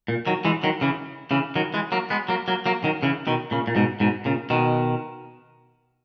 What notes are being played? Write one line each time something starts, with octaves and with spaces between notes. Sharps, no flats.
A#2
D#3 F#3
E3 G#3
D#3 F#3
C#3 E3
C#3 E3
D#3 F#3
E3 G#3
F#3 A#3
G#3 B3
F#3 A#3
F#3 A#3
F#3 A#3
D#3 F#3
C#3 E3
B2 D#3
A#2 C#3
A#2
G#2 B2
G#2 B2
A#2 C#3
B2 D#3